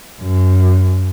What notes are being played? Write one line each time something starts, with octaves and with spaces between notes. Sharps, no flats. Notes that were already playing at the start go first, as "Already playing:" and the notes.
F#2